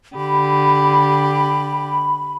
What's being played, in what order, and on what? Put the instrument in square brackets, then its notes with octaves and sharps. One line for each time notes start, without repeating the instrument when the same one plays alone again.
[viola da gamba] D3 G4 [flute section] B5